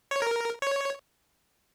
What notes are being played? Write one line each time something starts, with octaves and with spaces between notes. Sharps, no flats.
C#5
A#4
C#5